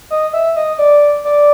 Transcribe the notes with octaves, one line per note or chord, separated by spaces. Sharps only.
D#5
E5
D#5
D5
D5